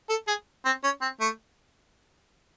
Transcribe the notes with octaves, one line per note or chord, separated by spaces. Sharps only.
A4
G#4
C4
C#4
C4
A3